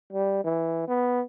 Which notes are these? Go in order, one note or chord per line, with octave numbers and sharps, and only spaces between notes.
G3
E3
B3